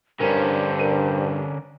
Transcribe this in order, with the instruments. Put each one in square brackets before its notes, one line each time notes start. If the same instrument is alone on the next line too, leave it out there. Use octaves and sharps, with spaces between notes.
[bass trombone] G2 [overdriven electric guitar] D3 C#4 [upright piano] A#4 [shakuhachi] C5
[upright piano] A#4 D#7